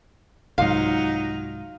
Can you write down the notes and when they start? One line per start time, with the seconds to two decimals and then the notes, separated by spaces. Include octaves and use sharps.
0.58 C2 G#2 F#3 D#4 F4 F5